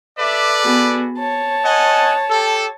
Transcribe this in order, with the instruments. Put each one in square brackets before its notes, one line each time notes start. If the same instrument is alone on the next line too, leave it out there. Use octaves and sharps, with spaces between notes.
[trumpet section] A4 B4 D5 [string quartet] E5 D6
[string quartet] B3 F#4 G#4
C#5 A5
[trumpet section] D#5 F#5 G#5
G4 A4